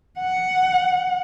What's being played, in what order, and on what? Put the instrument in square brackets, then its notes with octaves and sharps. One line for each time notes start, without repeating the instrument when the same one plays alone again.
[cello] F#5